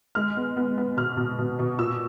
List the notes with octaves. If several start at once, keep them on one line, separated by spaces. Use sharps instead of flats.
G#3 F6
B3
B3
B3
B2 F6
B2
B2
B2
A#2 E6